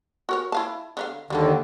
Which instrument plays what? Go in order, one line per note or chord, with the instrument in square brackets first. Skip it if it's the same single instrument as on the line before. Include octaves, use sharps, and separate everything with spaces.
[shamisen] F#4 A#4 C#5
E4 F5 A5
D3 D#4 F5
[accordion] D#2 D3 D#3 [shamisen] G3 A#3 A4